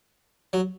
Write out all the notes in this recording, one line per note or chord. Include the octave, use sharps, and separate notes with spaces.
F#3